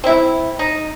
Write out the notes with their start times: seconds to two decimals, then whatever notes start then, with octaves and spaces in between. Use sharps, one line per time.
0.04 C4 E4
0.59 D#4